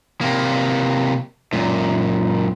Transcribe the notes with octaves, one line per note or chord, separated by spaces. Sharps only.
C3 A#3
F#2 A#2